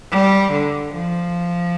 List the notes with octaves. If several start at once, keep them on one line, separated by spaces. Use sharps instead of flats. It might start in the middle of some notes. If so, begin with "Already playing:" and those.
G3
D3
F3